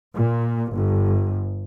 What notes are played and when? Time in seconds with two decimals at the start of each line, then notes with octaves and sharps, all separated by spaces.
0.16 A#2
0.74 G1